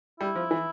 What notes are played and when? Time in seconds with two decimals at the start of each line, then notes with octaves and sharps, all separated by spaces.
0.20 G3 E4
0.36 F3
0.51 E3